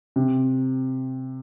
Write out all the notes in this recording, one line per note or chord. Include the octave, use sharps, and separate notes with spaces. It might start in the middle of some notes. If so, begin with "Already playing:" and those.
C3